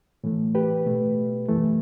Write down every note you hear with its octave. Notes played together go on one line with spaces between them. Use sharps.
A2 E3 A3
G4 B4
B2 A3
F#2 E3 A3